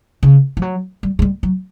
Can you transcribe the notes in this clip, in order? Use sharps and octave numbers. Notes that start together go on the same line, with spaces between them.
C#3
F3
F#3
G3
G#3
G3
F#3